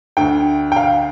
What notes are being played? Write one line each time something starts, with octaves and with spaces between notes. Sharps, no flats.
D2 D3 G5
G5
F5